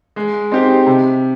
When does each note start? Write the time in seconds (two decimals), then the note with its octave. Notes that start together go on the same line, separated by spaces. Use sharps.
0.16 G#3
0.52 C4 D#4 G4
0.86 C3